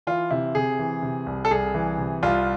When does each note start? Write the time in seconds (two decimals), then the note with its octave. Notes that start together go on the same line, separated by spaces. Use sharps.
0.07 E3 F4
0.31 C3 E4
0.55 C3 G#4
0.79 E3
1.02 C3
1.26 C2
1.45 A4
1.51 C2 G#4
1.74 E3
1.98 C3
2.23 C2 F4